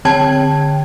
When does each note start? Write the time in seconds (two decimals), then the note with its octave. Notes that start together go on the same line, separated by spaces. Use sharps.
0.05 D3 C4 C#5 G5 A5 G#6